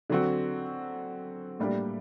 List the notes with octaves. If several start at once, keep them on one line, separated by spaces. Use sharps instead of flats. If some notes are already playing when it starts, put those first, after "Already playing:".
D3 F#3 C4 F#4
A2 G3 A#3 D4 G4